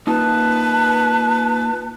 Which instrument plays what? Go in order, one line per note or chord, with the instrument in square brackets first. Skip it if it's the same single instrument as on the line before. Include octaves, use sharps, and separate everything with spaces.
[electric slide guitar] A#3 D#4 F4 [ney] B4 [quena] A5